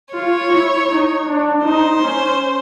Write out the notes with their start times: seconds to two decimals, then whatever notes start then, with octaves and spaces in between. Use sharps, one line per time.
0.14 F4 C#5
0.52 E4
0.90 D#4
1.27 D4
1.64 D#4 C5
2.02 C#4